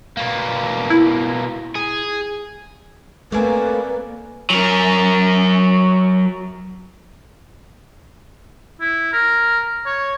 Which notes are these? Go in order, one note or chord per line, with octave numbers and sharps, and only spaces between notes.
B2 A#3
E4
G#4
A3 A#3 C4 B4 D5 G#5
F#3 A#4
E4
A#4
C#5